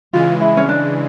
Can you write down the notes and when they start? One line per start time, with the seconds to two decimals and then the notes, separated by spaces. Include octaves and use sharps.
0.13 C#3 E3 G#3 F4
0.41 E4
0.57 C#4
0.69 D4